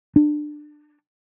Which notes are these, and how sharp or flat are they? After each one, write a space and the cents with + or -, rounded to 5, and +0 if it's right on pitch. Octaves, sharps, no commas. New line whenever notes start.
D4 +25